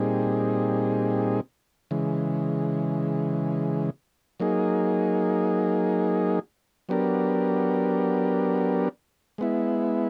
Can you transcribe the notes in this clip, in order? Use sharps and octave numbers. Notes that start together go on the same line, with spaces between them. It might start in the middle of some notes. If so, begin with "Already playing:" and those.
Already playing: A#2 G3 C4 D#4 G#4
C#3 E3 G#3
F#3 A#3 D#4 G#4
F#3 B3 D4 G4 A#4
G#3 B3 E4